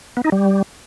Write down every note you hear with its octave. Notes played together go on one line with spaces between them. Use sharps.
B3
D#4
G3